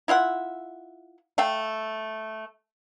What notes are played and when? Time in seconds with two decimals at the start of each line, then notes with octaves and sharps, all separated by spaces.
0.08 E4 F4 E5 F#5
1.38 A3 F5 G5